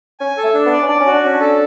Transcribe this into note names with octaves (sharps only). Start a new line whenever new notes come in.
C#4 G#5
A4
A3
D4
B3
D5
C#4
D4 D5
C#4
F#4
D4
C#4
D4
A4